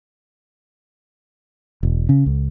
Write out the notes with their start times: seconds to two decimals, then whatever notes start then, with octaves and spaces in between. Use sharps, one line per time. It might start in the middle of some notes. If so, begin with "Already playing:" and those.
1.83 E1
2.09 C#3
2.26 C#2